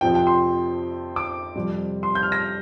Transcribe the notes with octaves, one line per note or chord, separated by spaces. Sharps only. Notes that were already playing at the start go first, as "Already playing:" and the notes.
F2 C3 F3 C4 G5
G5
C6
D6
F2 C3 G3
C6
G6
F6
A#6